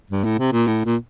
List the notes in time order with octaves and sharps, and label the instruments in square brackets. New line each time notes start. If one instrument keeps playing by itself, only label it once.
[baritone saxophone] G2
A2
C3
A#2
A2
A#2